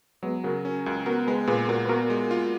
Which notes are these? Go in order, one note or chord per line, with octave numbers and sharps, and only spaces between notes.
F#3 G#3 B3
C#3 F#4 A#4
C#4
C#2
B3 F#4 A#4
G#3 G#4 B4
A#2 G#4 B4
A#2 F#4 A#4
B4
B3 F#4 A#4
G#3
F4